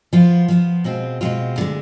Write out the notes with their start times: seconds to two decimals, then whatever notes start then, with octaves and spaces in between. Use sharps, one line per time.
0.13 F3 B3 F4
0.48 F3 B3 F4
0.84 B2 G#3 C4 F4
1.21 B2 G#3 C4 F4
1.56 D2 D3 G#3